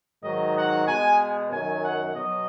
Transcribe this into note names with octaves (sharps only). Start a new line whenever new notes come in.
G#2 D#3 F#3 D#5
F#5
B2 G#3 G#5
F#2 D#3 F#3 G#5
F#5
B2 F#3 D#5